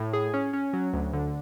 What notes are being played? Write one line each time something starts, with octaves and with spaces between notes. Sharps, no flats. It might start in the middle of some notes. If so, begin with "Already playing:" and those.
Already playing: A2
G#4
C#4
C#4
F#3
D2
D3